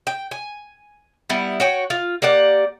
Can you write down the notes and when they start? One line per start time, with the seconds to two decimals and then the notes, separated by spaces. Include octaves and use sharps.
0.07 G5
0.31 G#5
1.29 G3 B3 E4
1.60 F#4 C#5 G5
1.90 F4
2.22 A#3 G4 D5 F#5